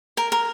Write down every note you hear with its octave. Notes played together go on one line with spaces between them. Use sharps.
A#4
A#4